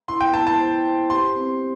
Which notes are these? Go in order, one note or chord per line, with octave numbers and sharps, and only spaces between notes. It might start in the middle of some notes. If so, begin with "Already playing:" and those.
E4 C6
G5
E4 A5
A5
C5
C5
G4 C6
C4